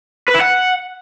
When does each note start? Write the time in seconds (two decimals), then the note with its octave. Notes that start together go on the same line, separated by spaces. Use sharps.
0.28 B4
0.34 E4
0.41 F#5